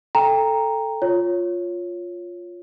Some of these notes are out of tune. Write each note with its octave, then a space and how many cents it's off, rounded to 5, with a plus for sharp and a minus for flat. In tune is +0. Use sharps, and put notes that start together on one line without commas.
A4 +0 G5 +25 A#5 +0
F4 +5 C#5 +0